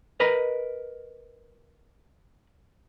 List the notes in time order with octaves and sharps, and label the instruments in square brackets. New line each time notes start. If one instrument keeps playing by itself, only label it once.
[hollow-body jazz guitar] A#4 B4 D#5 A#5